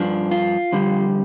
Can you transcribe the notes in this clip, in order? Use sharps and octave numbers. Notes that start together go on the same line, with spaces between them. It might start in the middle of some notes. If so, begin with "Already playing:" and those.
Already playing: G2 F3 D4
F4
F2 D3 G3